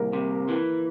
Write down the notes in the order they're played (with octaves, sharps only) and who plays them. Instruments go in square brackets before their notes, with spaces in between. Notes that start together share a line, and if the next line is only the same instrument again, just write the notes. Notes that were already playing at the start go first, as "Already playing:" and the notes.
Already playing: [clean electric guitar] C2 [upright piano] A#3 A#4
[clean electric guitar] C3
E3